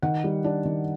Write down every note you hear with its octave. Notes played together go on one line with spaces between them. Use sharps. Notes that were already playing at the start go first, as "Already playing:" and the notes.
D#3 F#5
G3
D4
D#3